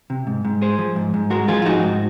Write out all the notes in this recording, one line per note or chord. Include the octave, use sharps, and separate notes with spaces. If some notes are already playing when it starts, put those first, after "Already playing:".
C3
G#2
G#2
G#3 G#4 C5
F3
G#2
G#2
G#3 F#4 A#4
F3 F4 G#4
F4
G#2 D#4 F#4
G#2